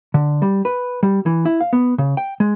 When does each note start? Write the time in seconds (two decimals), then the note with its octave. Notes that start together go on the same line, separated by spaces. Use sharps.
0.14 D3
0.42 G3
0.65 B4
1.03 G3
1.26 E3
1.45 E4
1.61 F5
1.73 B3
1.98 C#3
2.17 G5
2.40 G#3